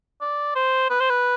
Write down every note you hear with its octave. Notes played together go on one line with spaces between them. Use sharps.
D5
C5
B4
C5
B4